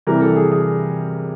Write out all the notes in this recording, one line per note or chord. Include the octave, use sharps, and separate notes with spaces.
C3 E3 G3 A#4
A4
G#4
G#4